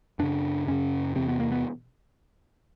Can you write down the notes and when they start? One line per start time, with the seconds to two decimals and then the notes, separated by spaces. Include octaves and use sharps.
0.19 F#2 C#3 D4
0.67 F#2 C#3 C#4
1.16 E2 C3 C4
1.28 B3
1.40 A#3
1.52 B3